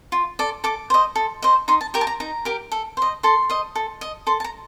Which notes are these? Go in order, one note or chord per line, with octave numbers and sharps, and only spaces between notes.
F4
A4 D5
A4 D6
C5 D#5
A4
C5 D#5
D#4 C6
A5
G4 A#4 G5
A5
A#5
D#4 A#5
G4 A#4
A4
C5 D#5
A4 C6
C5 D#5
A4
D#5
A4 C6
A5
A#5